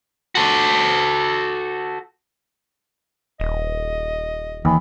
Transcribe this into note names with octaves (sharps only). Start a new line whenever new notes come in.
F#4 A4
D#1 D#5
D#2 E3